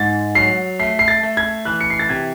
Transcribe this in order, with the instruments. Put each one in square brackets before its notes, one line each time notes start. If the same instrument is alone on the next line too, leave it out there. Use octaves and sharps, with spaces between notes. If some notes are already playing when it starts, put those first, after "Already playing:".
Already playing: [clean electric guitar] G#2 [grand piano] A6
[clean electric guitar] F#3 [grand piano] C7
[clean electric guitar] A3 [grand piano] C7
[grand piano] C7
A6
[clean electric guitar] A3
[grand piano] G#6
[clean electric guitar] E3 [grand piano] F#6
[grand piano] C#7
C7
A6
[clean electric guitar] C3 [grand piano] G#6